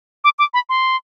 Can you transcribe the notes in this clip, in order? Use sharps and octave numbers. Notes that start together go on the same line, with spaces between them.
D6
D6
B5
C6